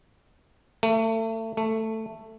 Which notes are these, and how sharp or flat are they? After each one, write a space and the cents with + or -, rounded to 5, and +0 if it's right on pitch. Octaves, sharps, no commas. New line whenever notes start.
A3 +30
A3 +10